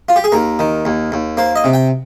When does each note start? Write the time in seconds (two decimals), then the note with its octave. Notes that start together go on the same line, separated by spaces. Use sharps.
0.09 F4
0.16 G4
0.24 G#4
0.32 D#2 A#4
0.59 D#3
0.85 D#2
1.12 D#2
1.37 A#3 C5
1.56 D#5
1.64 C3
1.73 G5